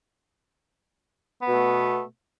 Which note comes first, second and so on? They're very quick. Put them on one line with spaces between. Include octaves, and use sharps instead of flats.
B3 B2 A3